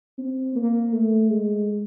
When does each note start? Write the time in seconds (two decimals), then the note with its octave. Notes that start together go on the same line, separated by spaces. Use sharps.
0.18 C4
0.55 A#3
0.93 A3
1.30 G#3